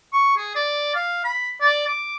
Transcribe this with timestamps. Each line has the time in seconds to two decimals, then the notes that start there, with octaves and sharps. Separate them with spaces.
0.13 C#6
0.37 G#4
0.55 D5
0.95 F5
1.24 B5
1.61 D5
1.87 D6